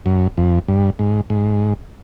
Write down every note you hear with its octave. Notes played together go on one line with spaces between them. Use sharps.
F#2
F2
G2
G#2
G#2